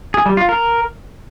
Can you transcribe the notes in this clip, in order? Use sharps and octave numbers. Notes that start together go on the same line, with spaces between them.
G#4
G3
F4
A#4